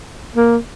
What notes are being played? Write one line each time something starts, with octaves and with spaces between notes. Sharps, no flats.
A#3